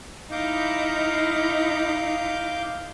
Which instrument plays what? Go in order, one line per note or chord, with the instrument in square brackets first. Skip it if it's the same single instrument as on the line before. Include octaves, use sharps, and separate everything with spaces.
[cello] D#4 E4 [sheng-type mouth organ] F5 D6 G6